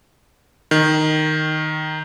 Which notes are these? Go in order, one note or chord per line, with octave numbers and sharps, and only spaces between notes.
D#3